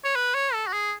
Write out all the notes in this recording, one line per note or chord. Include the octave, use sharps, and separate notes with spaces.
C#5
B4
C#5
A4
F#4
G#4